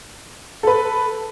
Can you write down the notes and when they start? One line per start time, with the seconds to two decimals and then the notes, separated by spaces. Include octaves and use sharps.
0.63 A4 B4